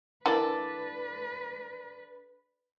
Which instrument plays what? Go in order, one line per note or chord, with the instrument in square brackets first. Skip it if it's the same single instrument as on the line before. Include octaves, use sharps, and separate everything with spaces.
[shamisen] E3 A#3 [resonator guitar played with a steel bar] D4 D5 [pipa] A4 [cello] B4